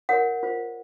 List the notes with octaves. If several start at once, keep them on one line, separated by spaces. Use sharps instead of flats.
F4 A#4 C#5 F#5
F4 C5